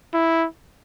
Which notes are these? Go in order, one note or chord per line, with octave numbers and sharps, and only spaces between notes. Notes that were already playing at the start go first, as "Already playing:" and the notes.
E4